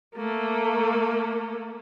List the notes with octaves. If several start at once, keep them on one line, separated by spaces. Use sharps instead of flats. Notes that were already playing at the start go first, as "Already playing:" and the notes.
A3 A#3